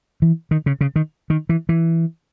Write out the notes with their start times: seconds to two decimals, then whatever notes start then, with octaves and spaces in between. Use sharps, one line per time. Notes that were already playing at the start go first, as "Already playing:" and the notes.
0.22 E3
0.51 D#3
0.66 C#3
0.81 C#3
0.96 D#3
1.30 D#3
1.49 E3
1.69 E3